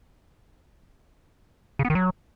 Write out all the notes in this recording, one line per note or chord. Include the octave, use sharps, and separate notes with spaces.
C#3
B3
D#3
F#3